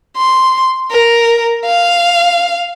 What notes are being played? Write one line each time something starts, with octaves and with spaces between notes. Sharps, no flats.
C6
A#4
F5